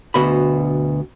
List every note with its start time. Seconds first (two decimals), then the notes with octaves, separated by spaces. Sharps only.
0.14 D2 B2 B5